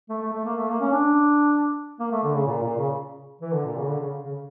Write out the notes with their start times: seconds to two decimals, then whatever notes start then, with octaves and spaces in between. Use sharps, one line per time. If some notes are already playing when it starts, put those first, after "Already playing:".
0.10 A3
0.22 A3
0.33 A3
0.45 A#3
0.57 A3
0.68 A#3
0.81 C#4
0.93 D4
2.00 A#3
2.11 A3
2.23 D3
2.34 C#3
2.47 A#2
2.63 A#2
2.77 C#3
3.41 E3
3.53 D3
3.65 A#2
3.77 C#3
3.88 D3
4.00 C#3
4.25 C#3